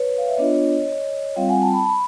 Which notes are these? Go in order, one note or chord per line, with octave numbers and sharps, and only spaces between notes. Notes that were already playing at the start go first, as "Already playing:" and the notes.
Already playing: B4 C#5
F5
E5
B3 D4 F4 C#5 D#5
G3 C4 F4 F5 G5
F#5 G#5
G5 A5
A5 B5
B5